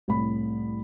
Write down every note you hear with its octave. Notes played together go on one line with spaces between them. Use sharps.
C2 A2 B5